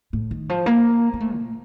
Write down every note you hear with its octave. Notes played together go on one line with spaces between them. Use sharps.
A2
D#3
F3
A#3
A#3
A3
A#2